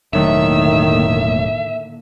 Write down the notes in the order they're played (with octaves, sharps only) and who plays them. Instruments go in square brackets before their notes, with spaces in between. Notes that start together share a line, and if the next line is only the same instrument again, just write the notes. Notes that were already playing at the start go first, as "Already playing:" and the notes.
[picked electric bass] E1 F#3 A3 [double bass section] A2 D3 A#3 [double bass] D#3 [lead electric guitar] E5